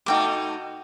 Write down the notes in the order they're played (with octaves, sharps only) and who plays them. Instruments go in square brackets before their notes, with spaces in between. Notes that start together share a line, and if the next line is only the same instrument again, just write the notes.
[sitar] B2 A3 D#4 [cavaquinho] F#4 G5 D6